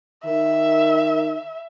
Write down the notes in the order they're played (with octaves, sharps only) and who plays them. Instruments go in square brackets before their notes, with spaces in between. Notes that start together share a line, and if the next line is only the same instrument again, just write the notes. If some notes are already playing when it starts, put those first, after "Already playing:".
[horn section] D#3 [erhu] E5